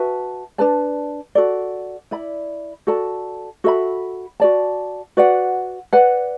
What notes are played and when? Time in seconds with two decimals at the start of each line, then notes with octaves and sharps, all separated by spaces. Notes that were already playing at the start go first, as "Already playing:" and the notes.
Already playing: F#4 B4 E5 A5
0.58 D4 B4 D5 A5
1.35 F#4 A4 D5
2.11 E4 D5 B5
2.87 F#4 A4 D5 A5
3.64 F#4 A4 E5 B5
4.40 F#4 D5 A5
5.17 F#4 B4 D5 F#5
5.93 B4 D5 F#5